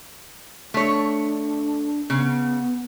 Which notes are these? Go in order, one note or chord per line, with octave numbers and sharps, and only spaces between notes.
A3 D4 C#5
C#3 B3